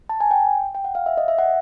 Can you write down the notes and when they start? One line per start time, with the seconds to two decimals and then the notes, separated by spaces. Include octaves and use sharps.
0.09 A5
0.20 G#5
0.31 G5
0.75 G5
0.84 F#5
0.95 F5
1.06 E5
1.17 D#5
1.28 E5
1.38 F#5